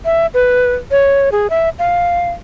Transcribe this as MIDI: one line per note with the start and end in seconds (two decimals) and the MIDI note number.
0.05 0.26 76
0.34 0.72 71
0.91 1.29 73
1.32 1.50 68
1.50 1.69 76
1.79 2.29 77